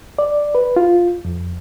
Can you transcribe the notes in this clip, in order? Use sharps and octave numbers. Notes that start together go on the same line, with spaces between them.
D5
B4
F4
F2